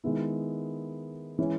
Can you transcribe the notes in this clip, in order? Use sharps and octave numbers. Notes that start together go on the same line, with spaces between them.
D#3 G#3 B3 E4
E3 G#3 C#4